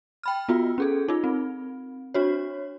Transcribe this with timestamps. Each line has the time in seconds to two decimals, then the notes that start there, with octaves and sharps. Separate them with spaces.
0.23 G5 B5 F6
0.49 B3 F4 F#4
0.78 C#4 G#4 A4
1.08 D#4 F4
1.24 C4
2.14 D4 F#4 C#5